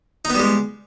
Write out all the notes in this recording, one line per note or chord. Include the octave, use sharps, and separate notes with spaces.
G3 G#3 B3 D#4